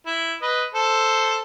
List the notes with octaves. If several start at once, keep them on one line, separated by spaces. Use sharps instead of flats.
E4
B4 D#5
A4 C5